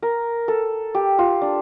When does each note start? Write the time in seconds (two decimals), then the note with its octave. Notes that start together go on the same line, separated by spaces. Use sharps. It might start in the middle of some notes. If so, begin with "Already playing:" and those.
0.02 A#4
0.48 A4
0.95 G4
1.18 F4
1.42 D4